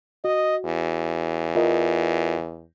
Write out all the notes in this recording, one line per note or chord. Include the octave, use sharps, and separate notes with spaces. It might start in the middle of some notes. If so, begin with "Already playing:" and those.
F#4 D#5
E2
F4 A#4 D#5